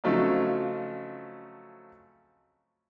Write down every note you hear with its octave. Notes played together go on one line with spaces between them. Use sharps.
C#3 F3 F#3 A3 C4 D#4